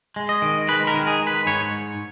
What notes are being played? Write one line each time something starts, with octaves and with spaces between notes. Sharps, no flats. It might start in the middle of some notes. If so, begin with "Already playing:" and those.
G#3
D#5
D#3
G#3 B4
A#4
D#3
G#4
G#3
B4
G#2 C#5